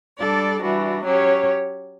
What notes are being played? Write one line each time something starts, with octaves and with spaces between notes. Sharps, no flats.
G3 D4 A4 D5
E3 G3 D4 F#4
F#3 C#4 G4 C#5